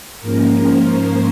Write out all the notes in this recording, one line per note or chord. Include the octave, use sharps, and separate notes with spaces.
G#2 F3 A#3 C#4 A#4
C5